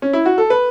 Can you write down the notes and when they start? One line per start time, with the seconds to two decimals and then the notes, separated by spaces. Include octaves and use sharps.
0.02 C#4
0.13 E4
0.26 F#4
0.38 A4
0.50 B4